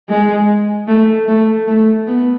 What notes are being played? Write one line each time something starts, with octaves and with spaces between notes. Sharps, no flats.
G#3
A3
A3
A3
B3